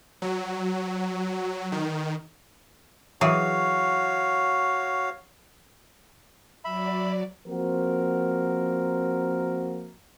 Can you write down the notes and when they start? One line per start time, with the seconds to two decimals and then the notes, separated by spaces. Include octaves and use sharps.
0.22 F#3
1.72 D#3
3.21 E3 F#3 F#4 G#4 C#5 F5
6.65 F#3 D5 E5 B5
7.46 F3 A#3 C4 F#4 A#4